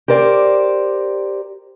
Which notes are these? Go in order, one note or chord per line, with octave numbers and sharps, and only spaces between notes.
G4 A#4 C5 D5